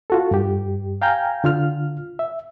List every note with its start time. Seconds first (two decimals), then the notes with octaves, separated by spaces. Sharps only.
0.10 F4 F#4 A4
0.31 G2 G4
1.02 F5 G5 G#5 A#5 F6 G6
1.44 D3 F4 F6
2.19 E5